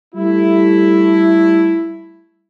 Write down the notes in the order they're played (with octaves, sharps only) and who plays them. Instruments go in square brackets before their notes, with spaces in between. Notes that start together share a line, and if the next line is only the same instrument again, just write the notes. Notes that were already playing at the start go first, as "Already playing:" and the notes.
[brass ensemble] G3 A3 E4